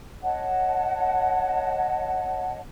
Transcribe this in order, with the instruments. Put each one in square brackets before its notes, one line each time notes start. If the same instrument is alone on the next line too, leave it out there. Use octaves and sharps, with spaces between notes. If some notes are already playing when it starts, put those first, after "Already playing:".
[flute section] C#5 D#5 F#5 A5